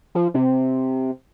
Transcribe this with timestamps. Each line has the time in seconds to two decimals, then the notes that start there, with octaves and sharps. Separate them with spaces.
0.15 F3
0.34 C3